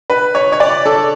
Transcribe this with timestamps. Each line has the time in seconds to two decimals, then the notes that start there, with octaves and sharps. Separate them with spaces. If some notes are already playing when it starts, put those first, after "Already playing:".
0.10 B4
0.35 C#5
0.52 C#5
0.60 D5
0.85 A4